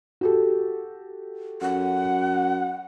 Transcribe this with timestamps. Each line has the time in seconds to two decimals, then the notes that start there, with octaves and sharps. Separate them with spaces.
0.21 F#4 G4 A4
1.62 F#2 F#5